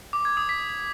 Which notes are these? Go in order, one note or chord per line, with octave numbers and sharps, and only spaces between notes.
D6
G#6
D#6
B6